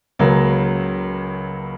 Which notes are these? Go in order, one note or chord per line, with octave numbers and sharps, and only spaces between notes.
C#2 C#3 F#3 A#3 C#4